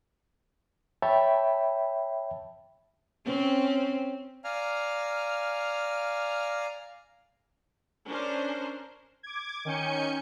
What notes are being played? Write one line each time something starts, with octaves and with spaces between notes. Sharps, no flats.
C#5 E5 G5 A5 B5
C4 C#4
D5 F5 G#5 A#5 F6
C#4 D4 A#4 C5
D6 G#6
D#3 C#4 G#5 G6 C#7